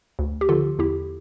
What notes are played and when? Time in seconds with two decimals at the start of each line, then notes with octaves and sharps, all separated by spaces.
0.19 D2
0.41 G4
0.49 D3 F3 F4 A4
0.79 E2 E4 G4